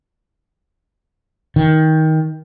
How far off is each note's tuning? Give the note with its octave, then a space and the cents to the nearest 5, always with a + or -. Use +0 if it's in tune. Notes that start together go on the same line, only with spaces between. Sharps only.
D#3 +20